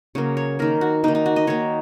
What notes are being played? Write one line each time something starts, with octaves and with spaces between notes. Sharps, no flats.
C#3 F#3 A#3 C#5
C#5
D#3 A#3 A#4
F#4
D#3 A#3 D#4
D#4
F#4
D#5
D#3 A#3 C#5